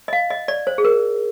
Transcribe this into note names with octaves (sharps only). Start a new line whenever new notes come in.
D#5
F5
D#5
D5
C5
G#4
A#4